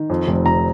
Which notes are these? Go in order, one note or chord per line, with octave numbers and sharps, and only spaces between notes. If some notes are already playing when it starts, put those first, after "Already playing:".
Already playing: D#3
F2
F1
F1 A#5